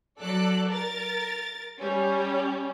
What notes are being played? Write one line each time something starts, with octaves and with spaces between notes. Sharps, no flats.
F#3 A4 D5 F#6
A#4 A6
G3 C#4